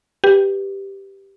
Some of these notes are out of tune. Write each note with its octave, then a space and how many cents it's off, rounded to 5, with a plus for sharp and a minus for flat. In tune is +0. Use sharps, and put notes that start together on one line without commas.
G4 +0 B4 -5